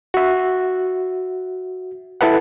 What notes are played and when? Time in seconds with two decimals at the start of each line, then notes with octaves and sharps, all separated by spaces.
0.14 F#4 E5
2.21 E4 A4 B4 F#5